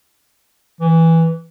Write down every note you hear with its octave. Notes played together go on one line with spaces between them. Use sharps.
E3